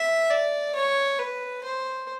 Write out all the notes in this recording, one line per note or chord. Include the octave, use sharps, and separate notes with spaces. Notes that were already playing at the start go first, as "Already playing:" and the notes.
Already playing: E5
D5
C#5
B4
C5